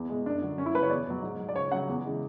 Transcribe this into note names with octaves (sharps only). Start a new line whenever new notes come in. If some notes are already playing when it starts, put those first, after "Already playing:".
Already playing: E2
B2 G#3
F#2 D4
D3 F#3
F#2 C#4
E4
C#3 F#3 B4
C#5
E2 D5
B2 F#3
G#2
F#3
D5
C#2 C#5
C#3 F#3 F#5
E2
C#3 E3 G#3